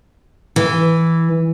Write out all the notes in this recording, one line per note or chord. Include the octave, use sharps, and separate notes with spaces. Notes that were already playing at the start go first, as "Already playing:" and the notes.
E3